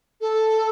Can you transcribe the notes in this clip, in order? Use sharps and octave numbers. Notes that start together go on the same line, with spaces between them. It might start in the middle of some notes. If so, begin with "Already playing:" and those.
A4